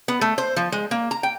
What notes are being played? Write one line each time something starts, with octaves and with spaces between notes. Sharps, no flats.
B3
A3
C5
F3
G#3
A#3
A#5
G5